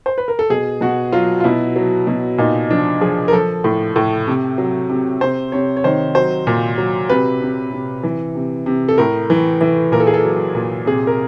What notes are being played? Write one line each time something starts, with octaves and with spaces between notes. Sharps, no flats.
C5
B4
A#4
A4
B2 G#4
B2 F#4
F#3 F4
F4
B2 E4
F#3
B2
A#2 D#4
F3 D4
F3 G#4
A#4
F3 A4
A2
A2
C3
F#3
C3
C3 C5
C3 C#5
C#5
D#3 C5
F#3 C5
A#2
F#3
C3 B4
C3
C3
E3
C3
C3
A4
A2 A#4
E3
E3
A#2 A#4
A4
G#4
A4
F#3
A#2
C3 G#4
A#4